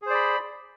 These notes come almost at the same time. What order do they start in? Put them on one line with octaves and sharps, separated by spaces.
G#4 C5 D5 B5